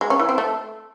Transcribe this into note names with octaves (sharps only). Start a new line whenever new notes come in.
G#3
C#4
E3
C4
A3